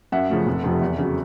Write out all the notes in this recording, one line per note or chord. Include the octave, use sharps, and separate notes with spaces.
F#2 E5 F#5
C#3 F3 A3
F1
F2 C3 F3
E2
C#3 F#3